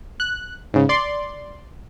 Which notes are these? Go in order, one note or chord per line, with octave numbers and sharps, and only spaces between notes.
F#6
G#2 C#3
D5 C6